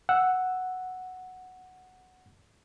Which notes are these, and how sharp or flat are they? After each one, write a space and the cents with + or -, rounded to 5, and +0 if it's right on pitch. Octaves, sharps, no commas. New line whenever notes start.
F#5 +0 E6 +0